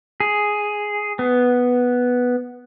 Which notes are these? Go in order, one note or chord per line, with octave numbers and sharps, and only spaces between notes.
G#4
B3